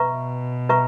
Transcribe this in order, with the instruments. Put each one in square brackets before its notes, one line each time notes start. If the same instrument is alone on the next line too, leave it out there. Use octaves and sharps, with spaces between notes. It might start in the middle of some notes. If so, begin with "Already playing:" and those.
Already playing: [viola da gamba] B2 [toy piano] B4 E5 A#5 C#6
[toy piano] B4 E5 A#5 C#6